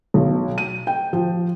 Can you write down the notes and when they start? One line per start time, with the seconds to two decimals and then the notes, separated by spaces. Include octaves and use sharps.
0.14 B1
0.58 D#7
0.87 G5
1.13 F3